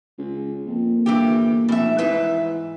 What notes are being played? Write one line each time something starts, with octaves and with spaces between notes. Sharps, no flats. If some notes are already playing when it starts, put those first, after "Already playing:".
C#2
F2 A#3
G1 G2 E3 G4
F1 B2 E5
G#2 E3 B4 E5